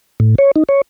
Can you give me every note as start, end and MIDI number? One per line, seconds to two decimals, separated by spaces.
0.20 0.35 45
0.38 0.51 73
0.56 0.63 63
0.69 0.81 73